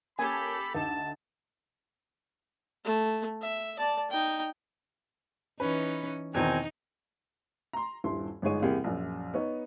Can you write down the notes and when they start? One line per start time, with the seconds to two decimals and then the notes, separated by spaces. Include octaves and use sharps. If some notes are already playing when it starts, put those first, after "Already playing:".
0.19 A#3 C#4 G4 A4 G#5 A5 B5
0.75 D2 D#4 A5 E7
2.85 A3
3.42 E5
3.78 D5 A5
4.10 D#4 G5
5.60 E3 C#4 D#4 B4
6.34 E2 B2 D#3 C4 D#4 G#5
7.73 A#5 C6
8.04 D#1 G2 E4 C6
8.42 G1 G#2 G#3 G#4 C#5 D#7
8.62 E1 C2 A#3 G4 G#4
8.84 A#1 F#2
9.34 B3 D#4 C#5